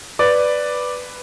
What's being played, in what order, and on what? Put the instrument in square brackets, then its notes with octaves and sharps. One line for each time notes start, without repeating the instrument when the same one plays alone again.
[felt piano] B4 [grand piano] D5